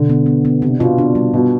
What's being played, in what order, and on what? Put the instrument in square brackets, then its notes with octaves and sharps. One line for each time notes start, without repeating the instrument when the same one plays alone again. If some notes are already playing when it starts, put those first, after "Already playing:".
Already playing: [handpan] B2 [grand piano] D3
[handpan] B3
B3
B3
[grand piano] C3 [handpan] D4
[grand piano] B2 [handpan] F4
[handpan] D4
G3
[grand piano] B2 [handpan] B3